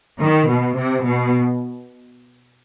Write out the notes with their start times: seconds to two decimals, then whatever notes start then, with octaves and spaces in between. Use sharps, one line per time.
0.20 D#3
0.48 B2
0.76 C3
1.04 B2